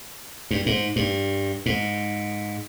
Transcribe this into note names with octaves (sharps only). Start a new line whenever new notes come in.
G2
G#2
G2
G#2